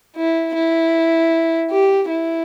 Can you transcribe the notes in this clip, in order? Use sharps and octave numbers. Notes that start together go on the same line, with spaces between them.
E4
E4
G4
E4